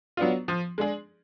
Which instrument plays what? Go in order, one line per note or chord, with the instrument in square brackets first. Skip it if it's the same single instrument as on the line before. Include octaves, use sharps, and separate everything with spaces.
[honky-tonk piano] F#3 B3 D4 F4
F3
G#3 D4 G#4